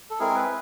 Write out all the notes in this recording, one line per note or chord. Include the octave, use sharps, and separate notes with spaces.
A4
G#3 C4 E4 G#4 A#4
B4